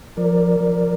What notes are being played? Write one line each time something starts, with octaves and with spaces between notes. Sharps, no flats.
F3 A#4 D5
F3